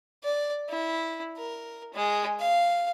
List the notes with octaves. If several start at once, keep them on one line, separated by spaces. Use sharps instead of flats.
D5
E4
A#4
G#3
F5